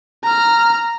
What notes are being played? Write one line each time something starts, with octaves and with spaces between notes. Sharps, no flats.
A#5 F6